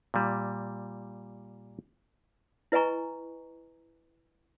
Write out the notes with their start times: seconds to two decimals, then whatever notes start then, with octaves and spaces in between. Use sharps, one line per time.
0.14 A#2 G3
2.72 E4 B4 D#5 G#5 A#5 C#6